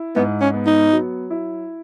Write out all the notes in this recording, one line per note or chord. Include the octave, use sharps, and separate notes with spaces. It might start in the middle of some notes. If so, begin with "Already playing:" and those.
Already playing: E4
G#2 B3
C#4
B3
D#4
F#3
E4